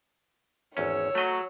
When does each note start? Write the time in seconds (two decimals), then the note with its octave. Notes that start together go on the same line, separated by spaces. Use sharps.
0.77 G#1 E2 C#4 C#5 E6
1.15 F#3 A3 D#5